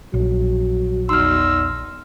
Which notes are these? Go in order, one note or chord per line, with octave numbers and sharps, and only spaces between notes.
A#1 F#3
E2 D#4 C6 E6 F6